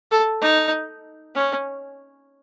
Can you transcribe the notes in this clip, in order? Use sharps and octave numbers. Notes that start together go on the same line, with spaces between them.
A4
D#4
C#4